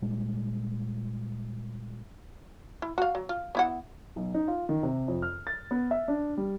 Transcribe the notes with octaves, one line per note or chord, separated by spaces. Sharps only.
A#2 G3 G#3
E4
F#4 F5
F#3
F4
B3 E4 F#5
B1
D#4
F4
D#3
C3
F2
F6
A6
B3
E5
D4
G3